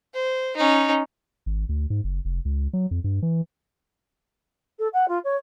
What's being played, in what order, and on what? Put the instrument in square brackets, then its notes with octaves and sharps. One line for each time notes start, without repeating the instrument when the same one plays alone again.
[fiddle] C5
C#4 D#4
[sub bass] G#1
D2
G#2
F#1
F1
C#2
F#3
F2
G2
E3
[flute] A4
F#5
F4
C#5